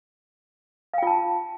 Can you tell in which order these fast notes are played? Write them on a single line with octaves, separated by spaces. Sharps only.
F5 G5 F4 A5